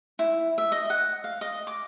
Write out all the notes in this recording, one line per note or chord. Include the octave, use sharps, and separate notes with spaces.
E4
E5
D#5
F#5
F5
D#5
D6